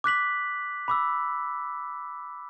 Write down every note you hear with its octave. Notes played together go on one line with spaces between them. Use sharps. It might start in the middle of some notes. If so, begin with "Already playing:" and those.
D6 F#6 B6 F#7
B5 D6 E6